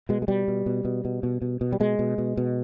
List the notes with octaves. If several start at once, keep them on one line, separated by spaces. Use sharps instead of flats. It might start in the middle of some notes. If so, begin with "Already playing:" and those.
B2 G#3
G#3
B2 G3
B2
B2
B2
B2
B2
B2
B2
G3
B2 G#3
B2
B2
B2